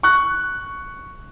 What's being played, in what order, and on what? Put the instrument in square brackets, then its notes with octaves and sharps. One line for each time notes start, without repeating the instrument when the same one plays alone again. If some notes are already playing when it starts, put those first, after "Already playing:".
[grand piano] C#6 F#6